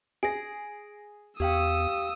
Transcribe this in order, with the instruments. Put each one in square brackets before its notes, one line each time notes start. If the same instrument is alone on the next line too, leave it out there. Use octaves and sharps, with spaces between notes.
[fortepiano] G#4 [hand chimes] A#6 D7
[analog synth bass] E2 [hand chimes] G4 F5 G5 [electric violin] D#6 E6